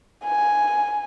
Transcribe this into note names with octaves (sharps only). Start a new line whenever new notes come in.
G#5